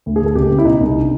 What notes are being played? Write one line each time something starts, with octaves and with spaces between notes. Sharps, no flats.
D2
G#4
D2 A4
C#2 G4
C#2
E4
B2 D#4
C2
D3